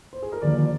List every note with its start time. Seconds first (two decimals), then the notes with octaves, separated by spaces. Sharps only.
0.13 C5
0.22 G#4
0.32 A#4
0.42 D#2 D3 F3 D5
0.57 D5